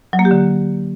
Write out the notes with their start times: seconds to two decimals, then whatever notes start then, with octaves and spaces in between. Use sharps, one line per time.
0.13 F#3
0.19 A#3
0.25 G4
0.31 D3